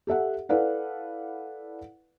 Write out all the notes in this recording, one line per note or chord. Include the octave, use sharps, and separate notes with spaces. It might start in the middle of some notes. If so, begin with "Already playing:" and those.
G4 A4 E5 F#5
E4 A4 B4 D5 F5 F#5